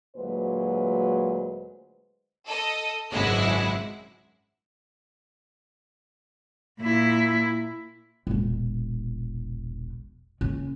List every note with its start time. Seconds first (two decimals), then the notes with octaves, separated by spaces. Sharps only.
0.16 D2 A#2 F#3 G#3 B4 C5
2.47 A4 D#5
3.11 G#1 C#2 F#2 G#3 E4 F#5
6.81 A#2 E4
8.27 E1 A#1
10.41 F#1 C#4